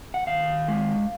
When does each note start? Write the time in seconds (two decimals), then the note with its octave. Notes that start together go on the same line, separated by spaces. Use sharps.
0.14 F#5
0.27 D#3 F5
0.68 G#3